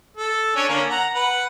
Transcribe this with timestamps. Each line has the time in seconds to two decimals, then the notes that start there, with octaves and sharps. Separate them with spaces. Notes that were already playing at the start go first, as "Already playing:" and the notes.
0.17 A4
0.56 C#4 D4 C#5
0.69 D3 A#3 C#4
0.90 F#5 A#5
1.15 B4 F#5